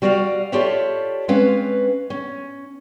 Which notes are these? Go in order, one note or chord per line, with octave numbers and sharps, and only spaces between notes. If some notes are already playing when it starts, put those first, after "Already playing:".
G3 F#4 D5 D#5 F5
F4 G4 A4 C#5 D5 E5
G#3 C4 C#4 B4 F5
C#4